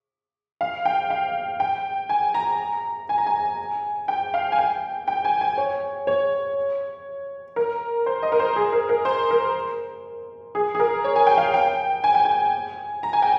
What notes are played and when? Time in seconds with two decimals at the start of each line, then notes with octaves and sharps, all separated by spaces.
0.61 F5
0.85 G5
1.10 F5
1.60 G5
2.09 G#5
2.34 A#5
3.09 G#5
3.18 A#5
3.27 G#5
4.08 G5
4.34 F5
4.52 G#5
4.58 G5
5.08 G5
5.25 G#5
5.41 G#5
5.58 C#5
6.07 C#5
7.56 A#4
8.06 C5
8.23 D#5
8.32 A#4
8.39 C5
8.56 G#4
8.73 A#4
8.89 A#4
9.05 C5
9.31 A#4
10.55 G#4
10.75 G#4
10.79 A#4
11.04 C#5
11.16 G#5
11.27 G5
11.38 F5
11.54 G5
12.04 G#5
12.14 G5
12.25 G#5
13.03 A#5
13.13 G#5
13.22 G5